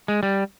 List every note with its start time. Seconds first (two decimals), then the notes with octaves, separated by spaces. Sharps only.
0.08 G#3
0.23 G3